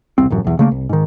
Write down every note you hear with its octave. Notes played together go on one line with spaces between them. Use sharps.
E1 C2 C4
D1 A1 F#2
B1 E2
C#3 A3 A#3
C2
G#2 D#3